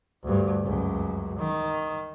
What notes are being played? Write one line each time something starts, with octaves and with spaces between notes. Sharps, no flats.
D2 G2
C#2 F#2
D#3